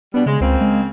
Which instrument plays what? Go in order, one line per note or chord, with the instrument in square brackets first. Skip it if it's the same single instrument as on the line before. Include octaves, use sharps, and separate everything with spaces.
[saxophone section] B2 G3 D4 [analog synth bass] B3
[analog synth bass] C#3 [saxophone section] G#3
[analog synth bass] C#2 [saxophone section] C#3 A#3 C4
[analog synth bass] G#3